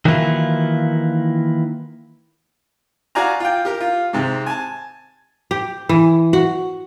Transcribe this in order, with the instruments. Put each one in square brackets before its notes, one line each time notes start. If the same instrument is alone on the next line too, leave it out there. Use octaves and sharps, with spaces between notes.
[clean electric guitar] D#3 E3 F#3 A#3 E4 F4
[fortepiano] F#4 D5 F5 G#5 A#5
F4 G5
G4 A#4
F4
G#2 C3 C4
G#5 A5
[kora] G4
E3
F#4